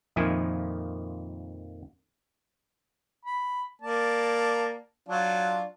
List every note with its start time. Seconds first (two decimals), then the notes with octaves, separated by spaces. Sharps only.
0.16 F2 A#2 D#3 F3 E4 G#5
3.25 B5
3.82 A#3 D5 A5
5.09 F#3 D4 F4